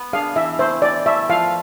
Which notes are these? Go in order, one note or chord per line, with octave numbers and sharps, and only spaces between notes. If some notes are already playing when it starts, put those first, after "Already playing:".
Already playing: B3
D4 G#4 F5
E3 E5
A3 E4 C5
E3 D5
A3 E4 E5
F3 F5